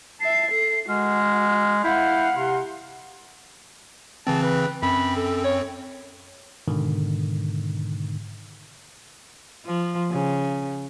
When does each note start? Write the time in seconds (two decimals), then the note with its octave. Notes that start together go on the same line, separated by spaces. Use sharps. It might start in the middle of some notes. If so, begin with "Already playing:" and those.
0.20 E5 A5 C7
0.51 A4
0.88 G#3 F#4 F6
1.84 E4 F5 F#5 G6
2.36 C3 C6
4.27 C#3 E3 C4 A5
4.43 B4
4.82 F#2 C4 B5
5.17 A4
5.45 C#5
6.68 G#2 B2 D3 D#3
9.65 F3
10.11 C#3